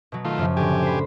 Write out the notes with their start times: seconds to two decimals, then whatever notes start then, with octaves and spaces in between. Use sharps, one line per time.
0.12 B2 F#3
0.25 D#3 A3 F4
0.38 F#2 C#3 F3
0.57 A2 D3 G4 G#5
0.82 C5 B5